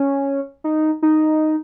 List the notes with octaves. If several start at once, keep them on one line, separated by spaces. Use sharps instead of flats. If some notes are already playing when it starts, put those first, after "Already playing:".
Already playing: C#4
D#4
D#4